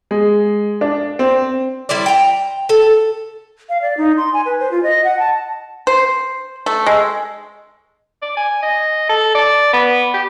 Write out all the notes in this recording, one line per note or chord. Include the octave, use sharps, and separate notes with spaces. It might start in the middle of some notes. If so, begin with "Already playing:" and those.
G#3
D4
C4
G3 E4 C5 D5
G5 A#5
A4
F5
D5
D#4
C6
G#5
B4
C5
F4
D#5
F#5
A5
C5
A3
G#3
D5
G#5
D#5
A4
D5
B3
G4